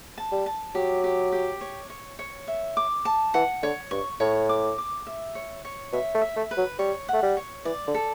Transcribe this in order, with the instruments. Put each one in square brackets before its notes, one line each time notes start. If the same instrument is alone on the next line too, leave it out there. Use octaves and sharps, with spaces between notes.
[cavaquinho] A5
[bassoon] G3
[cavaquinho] A5
[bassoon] F#3 [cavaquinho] G4
[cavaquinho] G4
G4
C#5
C#5
C#5
E5
D6
A5
[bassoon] E3 [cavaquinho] F#5
[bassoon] D3 [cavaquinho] C#5
[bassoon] G2 [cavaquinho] C#6
[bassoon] A2 [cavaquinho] C#5
[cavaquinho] D6
D6
E5
C#5
C#5
[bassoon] B2 [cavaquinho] E5
[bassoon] A3
[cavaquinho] E5
[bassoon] A3
[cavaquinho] B4
[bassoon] F#3
[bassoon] G3 [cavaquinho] C#5
[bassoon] A3 [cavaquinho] F#5
[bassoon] G3
[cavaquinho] C#5
[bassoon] E3 [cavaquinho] D5
[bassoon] D3
[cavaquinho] A4